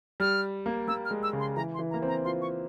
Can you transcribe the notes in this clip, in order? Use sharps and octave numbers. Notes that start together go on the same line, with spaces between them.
G3 F6
A#3
A#3 E6
F6
G#3
E6
C#3
C6
E3 A#5
C6
E3
A#5
A#3
C4
A#5
F4 C6
C#6